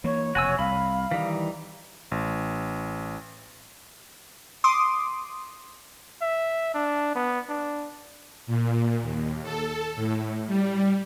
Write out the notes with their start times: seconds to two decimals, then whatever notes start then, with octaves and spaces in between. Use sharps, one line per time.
0.04 E3 A#3 C#5
0.35 F1 B2 F#4 G#5 E6
0.59 C2 F5 B5
1.11 D#3 E3 G3 D#4
2.11 A1
4.64 C6 D6 D#6
6.22 E5
6.74 D4
7.15 B3
7.49 D4
8.47 A#2
9.02 D#2
9.43 A4
9.96 A2
10.47 G3